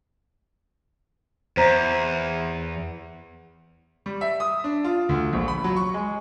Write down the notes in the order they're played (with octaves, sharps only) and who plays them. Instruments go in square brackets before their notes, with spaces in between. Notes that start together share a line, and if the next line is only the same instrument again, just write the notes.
[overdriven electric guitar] E2 [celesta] C5 A#5
[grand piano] G3
E5
D#6
D4
F4
D2
A#1
B5
F#3
C#6
G#3